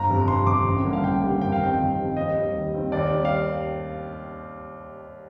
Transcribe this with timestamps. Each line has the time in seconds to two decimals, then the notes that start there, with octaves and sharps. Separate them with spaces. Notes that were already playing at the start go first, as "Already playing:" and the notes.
Already playing: G1 A#5
0.09 F2 C3
0.28 G1 C6
0.47 F2 C3 D6
0.66 A1
0.85 G2 D3 G3 A#3
0.93 F5
1.03 A1 G5
1.22 G2 D3 G3 A#3
1.41 F2 G5
1.52 F5
1.60 D#3 G3 C4 G5
1.79 F2
1.98 D#3 G3 C4
2.17 D#2 D#5
2.36 D#3 G3 C4
2.54 D#2
2.74 D#3 G3 C4
2.92 D#2 D5
3.11 D#3 G3 C4
3.25 F5